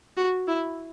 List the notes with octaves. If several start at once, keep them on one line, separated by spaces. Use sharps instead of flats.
F#4
E4